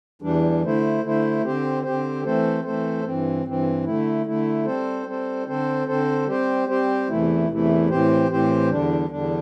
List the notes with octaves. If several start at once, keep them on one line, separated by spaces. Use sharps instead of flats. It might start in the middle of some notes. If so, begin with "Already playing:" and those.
E2 E3 G3 D4
D3 A3 E4 C5
D3 A3 E4 C5
D3 C4 G4 C5
D3 C4 G4 C5
E3 A3 C4 A4 C5
E3 A3 C4 A4 C5
G2 E3 C4
G2 E3 C4
D3 A3 E4
D3 A3 E4
G3 C4 A4 C5
G3 C4 A4 C5
D3 C4 A4 C5
D3 C4 A4 C5
G3 C4 G4 C5
G3 C4 G4 C5
E2 C3 E3 A3 E4
E2 C3 E3 A3 E4
A2 E3 C4 G4 C5
A2 E3 C4 G4 C5
E2 D3 G3 D4
E2 D3 G3 D4